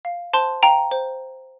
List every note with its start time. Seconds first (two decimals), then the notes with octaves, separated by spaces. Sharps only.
0.05 F5
0.33 C5 A5 C6
0.62 F5 G5 A#5
0.91 C5